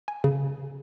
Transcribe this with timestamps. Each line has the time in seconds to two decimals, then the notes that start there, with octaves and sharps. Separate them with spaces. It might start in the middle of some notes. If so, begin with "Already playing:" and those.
0.08 G#5
0.24 C#3